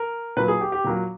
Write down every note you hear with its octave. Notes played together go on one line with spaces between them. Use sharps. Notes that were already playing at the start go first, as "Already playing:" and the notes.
Already playing: A#4
A#2 F#3 A#3 B4
G#4
G4
G4
A#2 F#3 A#3